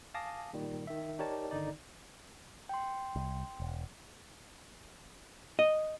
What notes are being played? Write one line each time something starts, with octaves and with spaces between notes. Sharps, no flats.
F5 G#5 A5 D6 D#6 A#6
A#2 D#3 G3
D#3 E5
D#4 G4 A#4 C#5 D5 A5
G1 D3 D#3 D#4 D5
G5 C6
C2
E1
D#5